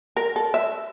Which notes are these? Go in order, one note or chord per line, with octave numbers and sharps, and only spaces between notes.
A#4
A4
E5